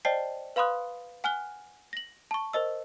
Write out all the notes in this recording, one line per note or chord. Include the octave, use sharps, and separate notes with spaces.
C5 D5 D#5 G5 A5 C7
B4 F5 B5 C6 D#6 F#6
F#5 G#5 F6 F#6 G7
A#6 F#7
A5 C#6
A#4 C5 D#5 E6